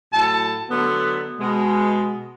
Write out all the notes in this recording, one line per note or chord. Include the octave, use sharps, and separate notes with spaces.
A2 F#3 A4 A5
D3 F#3 A3 B3
B2 G#3